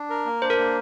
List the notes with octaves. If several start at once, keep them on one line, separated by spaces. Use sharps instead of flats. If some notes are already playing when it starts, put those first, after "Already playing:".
Already playing: D4
A#4
A#3
D4 C5
A#4
A#3